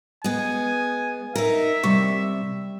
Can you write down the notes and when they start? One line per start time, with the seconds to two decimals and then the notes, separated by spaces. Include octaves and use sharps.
0.24 G#3 B3 G#5
1.36 D#4 A#4 E5
1.83 C3 G3 C#6